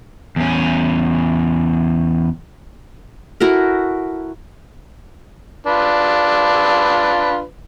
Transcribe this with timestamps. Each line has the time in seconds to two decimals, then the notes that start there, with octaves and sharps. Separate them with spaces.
0.36 E2 C#4
3.40 E4 F#4 A4 A#4
5.67 D4 F4 B4